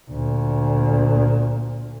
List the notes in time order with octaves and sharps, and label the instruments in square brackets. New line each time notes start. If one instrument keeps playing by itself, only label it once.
[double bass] D2 A#2